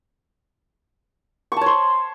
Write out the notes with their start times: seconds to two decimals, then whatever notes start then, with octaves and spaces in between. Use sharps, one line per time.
1.52 C#6
1.57 A5
1.61 C#5
1.66 C5